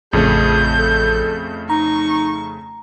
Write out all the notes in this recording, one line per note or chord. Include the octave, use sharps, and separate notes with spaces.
A1 F2 C#3 A3 G#4 G6
A4
D#4 A#5 C#6